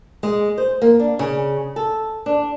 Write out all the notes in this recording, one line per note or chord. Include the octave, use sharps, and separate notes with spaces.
G#3
C5
A#3
D4
C#3
A4
D4